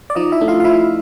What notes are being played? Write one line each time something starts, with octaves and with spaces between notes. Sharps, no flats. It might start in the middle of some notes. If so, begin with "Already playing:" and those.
D5
F3 D#4 D#5
E4 E5
A3 D4
F4 F5
F5
F3 E4 E5